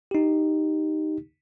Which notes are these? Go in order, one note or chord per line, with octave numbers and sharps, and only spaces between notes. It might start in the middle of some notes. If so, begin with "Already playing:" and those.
D#4 G4